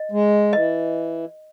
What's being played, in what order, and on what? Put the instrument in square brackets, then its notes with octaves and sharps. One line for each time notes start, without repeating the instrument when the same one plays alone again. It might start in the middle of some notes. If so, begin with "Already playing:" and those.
Already playing: [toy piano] D#5
[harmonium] G#3
[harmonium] E3 [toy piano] D#5